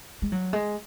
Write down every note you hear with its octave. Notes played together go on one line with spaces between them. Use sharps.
G#3
F#3
G#3